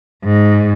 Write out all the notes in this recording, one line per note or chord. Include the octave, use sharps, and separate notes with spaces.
G#2